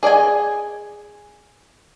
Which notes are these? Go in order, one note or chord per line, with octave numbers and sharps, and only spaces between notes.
G#4 D5 D#5 G#5